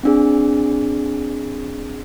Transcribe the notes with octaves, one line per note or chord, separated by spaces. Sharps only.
C4 D4 G#4